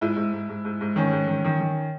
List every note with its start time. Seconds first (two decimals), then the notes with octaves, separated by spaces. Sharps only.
0.01 G#2 E4
0.16 G#2
0.33 G#2
0.49 G#2
0.65 G#2
0.81 G#2
0.96 D#3 C#4
1.12 G#2
1.28 D#3
1.44 D#3
1.60 D#3